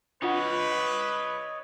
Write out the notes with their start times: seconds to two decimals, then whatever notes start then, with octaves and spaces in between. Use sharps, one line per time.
0.22 D4 F4 B4 C#5 D#5 F#5